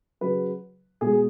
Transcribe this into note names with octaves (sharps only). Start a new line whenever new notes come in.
C#3 F#3 B4
B2 G#3 G#4